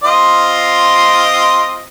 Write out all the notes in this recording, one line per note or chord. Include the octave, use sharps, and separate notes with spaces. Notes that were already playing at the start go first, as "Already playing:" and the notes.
C4 F4 D#5